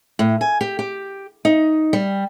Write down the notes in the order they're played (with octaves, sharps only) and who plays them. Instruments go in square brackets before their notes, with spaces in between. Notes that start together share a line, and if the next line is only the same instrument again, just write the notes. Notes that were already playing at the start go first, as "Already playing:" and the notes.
[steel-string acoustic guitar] A2
G#5
G4
G4
D#4
G3